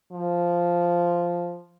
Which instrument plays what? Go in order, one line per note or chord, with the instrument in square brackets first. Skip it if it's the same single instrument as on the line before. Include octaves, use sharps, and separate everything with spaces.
[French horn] F3